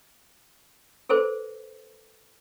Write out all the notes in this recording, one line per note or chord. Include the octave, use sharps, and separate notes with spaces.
G#4 A4 B4 C5